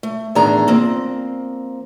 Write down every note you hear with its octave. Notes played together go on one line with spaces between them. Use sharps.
A3
E2 A2 D#3 D4 G#4 A#5
F3 A#3 C4